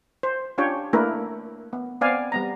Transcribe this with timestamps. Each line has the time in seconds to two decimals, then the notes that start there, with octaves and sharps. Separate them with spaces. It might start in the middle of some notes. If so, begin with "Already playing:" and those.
0.23 C5
0.58 C#4 D4 F4 G4 C#5 G5
0.93 A3 A#3 D4 E4 A#4 B4
1.73 B3
2.01 B3 C4 D5 F5 G#5
2.32 G3 B3 A#5